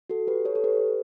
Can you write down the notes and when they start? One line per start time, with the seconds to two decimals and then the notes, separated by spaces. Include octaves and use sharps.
0.10 F#4 A4
0.27 G4 B4
0.45 A4 C#5
0.55 A4
0.64 G4 B4